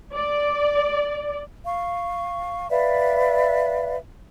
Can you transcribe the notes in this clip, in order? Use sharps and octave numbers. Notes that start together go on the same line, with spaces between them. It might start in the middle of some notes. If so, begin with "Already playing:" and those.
D5
F5 C#6
B4 D5 E5 F5